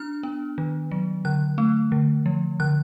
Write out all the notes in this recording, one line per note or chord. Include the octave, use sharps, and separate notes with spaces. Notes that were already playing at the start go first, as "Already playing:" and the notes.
Already playing: D4 F6
B3
D#3
F#3
D3 F#6
A3
D3
F3
D3 F#6